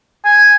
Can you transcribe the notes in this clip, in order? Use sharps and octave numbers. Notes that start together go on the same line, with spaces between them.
G#5